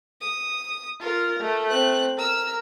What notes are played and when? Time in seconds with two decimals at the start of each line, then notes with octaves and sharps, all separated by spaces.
0.21 D#6
1.01 F4 A#4
1.41 A3
1.70 C4 F#6
2.18 A#4 E6